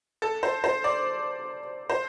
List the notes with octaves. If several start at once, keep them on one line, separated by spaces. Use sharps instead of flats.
A4
C5
C5
D5
C5